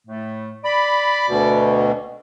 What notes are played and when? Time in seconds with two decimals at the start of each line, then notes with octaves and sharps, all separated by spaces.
0.07 A2 A3
0.65 D5 B5
1.28 D2 B2